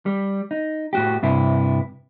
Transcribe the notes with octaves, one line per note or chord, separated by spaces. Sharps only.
G3
D#4
A2 F#4 G4
G2 C3 E4